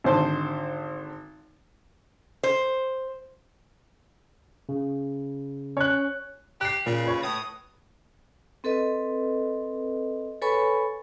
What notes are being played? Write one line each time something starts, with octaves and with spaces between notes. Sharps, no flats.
G#1 D3 C5 A5
C5
C#3
C#4 C#5 F#6
G4 F#6 C7
A#2 C#3
B4 C#5
A2 D#6
C4 A4 B4 D#5
A4 B4 C#5 G#5 B5 C#6